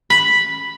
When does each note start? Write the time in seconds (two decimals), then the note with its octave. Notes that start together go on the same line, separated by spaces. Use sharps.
0.10 B5